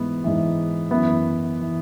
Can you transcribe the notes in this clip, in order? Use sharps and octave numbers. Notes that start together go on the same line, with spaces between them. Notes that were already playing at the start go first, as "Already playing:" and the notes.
Already playing: G#2 E3 B3
G#2 E3
F#2 E3 B3
E3